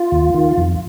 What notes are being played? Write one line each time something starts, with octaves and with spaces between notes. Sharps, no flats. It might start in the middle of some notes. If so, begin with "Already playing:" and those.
Already playing: F4
D#2
D#3
F2